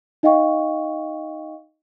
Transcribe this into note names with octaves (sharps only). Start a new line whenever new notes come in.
D#4 D#5 F5 G5 C#6